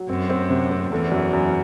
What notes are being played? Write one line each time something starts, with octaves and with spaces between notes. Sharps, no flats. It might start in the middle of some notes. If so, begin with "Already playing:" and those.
Already playing: F#3
F#2 C4
C4
C3
C4
E2 A3
F#2
F#2